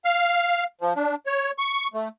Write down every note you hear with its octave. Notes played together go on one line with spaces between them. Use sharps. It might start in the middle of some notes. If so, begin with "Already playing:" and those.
F5
F3
D4
C#5
C#6
A3